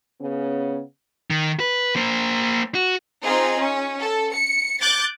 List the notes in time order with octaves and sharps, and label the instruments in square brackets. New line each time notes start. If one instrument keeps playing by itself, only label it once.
[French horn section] C#3 B3 C#4
[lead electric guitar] D#3
B4
A#3 C5
F#4
[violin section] C4 D#4 F4 G#4
C#4
A4
C#7
D6 F#6 G6 A6